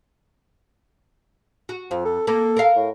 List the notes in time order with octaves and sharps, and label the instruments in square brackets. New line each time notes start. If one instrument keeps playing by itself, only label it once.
[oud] F#4
[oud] F2 [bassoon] F3
[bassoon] A4
[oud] A#3 [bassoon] A4
[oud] A#4 F5
[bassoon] A2